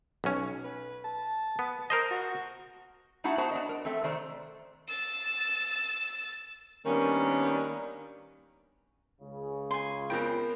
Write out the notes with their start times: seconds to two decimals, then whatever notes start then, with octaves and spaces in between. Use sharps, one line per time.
0.24 B1 C#4
0.64 B4
1.05 A5
1.59 B3
1.90 A#4 C5 D#5
2.11 F#4
3.24 A3 D#4 E4 F#4 F#5 A5
3.38 B3 F#4 C5 F#5 A5 A#5
3.51 B3 D4 D#5
3.69 A#4
3.85 A3 C4
4.04 C3 D#3 A3 C5 D5 A#5
4.88 E6 A6
6.86 D#3 G3 A#3 B3 C#4 D4
9.21 C#2 C#3
9.71 G#5 C6
10.10 F2 F3 B3 A#4 G5